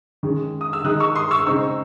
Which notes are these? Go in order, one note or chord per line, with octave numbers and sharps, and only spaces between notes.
D#3 G#3 C#4
D#6
E6
D#3 G#3 D#4 D#6 F#6
C#6 E6
C6 D#6
C#6 E6
C#3 G#3 C4 D#4 C#6 E6